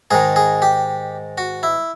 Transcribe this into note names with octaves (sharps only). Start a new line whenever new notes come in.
G#2 D#3 G#4
G#4
G4
F#4
E4